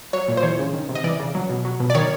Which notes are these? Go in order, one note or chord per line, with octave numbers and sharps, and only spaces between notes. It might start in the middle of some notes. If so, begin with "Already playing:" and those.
F#3 C#5
A#2
C5
E3 C#5
C#3
D#3
C3
D#5
E3 D5
C#3
F#3
B2
F#3
B2
D5
D#3 C#5